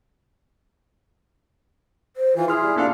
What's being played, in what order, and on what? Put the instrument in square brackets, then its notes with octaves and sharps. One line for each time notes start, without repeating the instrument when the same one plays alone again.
[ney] C5
[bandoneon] E3 [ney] F4
[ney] E4 [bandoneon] G#4 [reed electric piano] C6 F6
[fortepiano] G3
[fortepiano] A#2 A4 F5 [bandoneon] D4